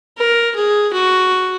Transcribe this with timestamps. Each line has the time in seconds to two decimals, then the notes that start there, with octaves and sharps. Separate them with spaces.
0.18 A#4
0.55 G#4
0.93 F#4